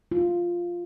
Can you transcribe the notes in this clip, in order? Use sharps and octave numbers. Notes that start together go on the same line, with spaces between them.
F4